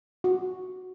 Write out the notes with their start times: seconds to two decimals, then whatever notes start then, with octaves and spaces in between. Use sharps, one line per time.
0.24 F#4